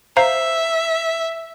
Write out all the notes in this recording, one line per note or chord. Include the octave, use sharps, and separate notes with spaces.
C5 E5 F5 A#5